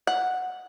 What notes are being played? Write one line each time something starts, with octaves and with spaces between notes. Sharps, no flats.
F#5